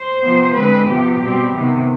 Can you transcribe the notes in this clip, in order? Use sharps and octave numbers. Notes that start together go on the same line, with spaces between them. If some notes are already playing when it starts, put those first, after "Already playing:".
Already playing: C5
C3 F3 B3
D3 G#3 C4 B4
C3 F3 B3 G4
B2 G3 C4
C3 D#3 B3